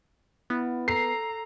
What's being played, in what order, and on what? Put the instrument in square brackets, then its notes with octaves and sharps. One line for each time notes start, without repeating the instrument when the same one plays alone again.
[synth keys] B3 [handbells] E4
[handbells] A4 [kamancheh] A#5 [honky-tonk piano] C7